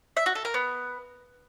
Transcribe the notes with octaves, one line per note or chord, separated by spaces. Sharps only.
E5
F#4
A4
A#4
B3